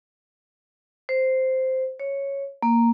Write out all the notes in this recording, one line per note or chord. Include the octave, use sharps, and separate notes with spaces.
C5
C#5
A#3